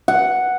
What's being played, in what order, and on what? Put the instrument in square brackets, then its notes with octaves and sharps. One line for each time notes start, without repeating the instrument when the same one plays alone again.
[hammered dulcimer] F#5